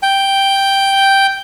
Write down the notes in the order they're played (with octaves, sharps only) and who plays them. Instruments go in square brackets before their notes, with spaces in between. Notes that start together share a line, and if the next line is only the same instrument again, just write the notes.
[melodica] G5